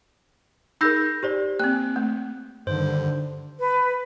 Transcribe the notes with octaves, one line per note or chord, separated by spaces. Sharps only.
D#4 G#4 A#4 E6 G6 A#6
G4 C5 D5
A#3 C4 F#6
A3
G2 D3 D#3 C5
B4